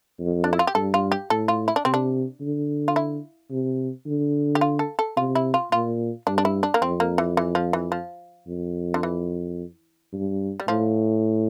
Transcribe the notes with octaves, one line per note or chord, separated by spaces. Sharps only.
F2
D4
E4
F4
G4
G2 A4
F4
G4
A2 A4
F4
E4
D4
C3 C4
D4
D3
F4
E4
C3
D3
G4
F4
A4
A4
C3 F4
E4
F4
A#2 F4
G2 D4
D4
E4
D4
A#3
F2 C4
A#3
E3
E3
F3
E3
F3
F2
D3
E3
G2
G3
A2 F3